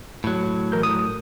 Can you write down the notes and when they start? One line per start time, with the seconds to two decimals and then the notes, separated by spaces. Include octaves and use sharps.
0.24 A2 F#3
0.72 E3 A#4 G6
0.83 D#6